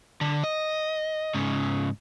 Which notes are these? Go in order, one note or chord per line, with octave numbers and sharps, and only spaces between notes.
D3
D#5
G#2 C#3